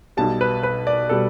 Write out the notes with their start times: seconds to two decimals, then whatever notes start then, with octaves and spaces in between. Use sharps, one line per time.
0.17 B1 B2 G3 A5
0.41 B4
0.63 B4
0.87 D5
1.09 B2 G3 A4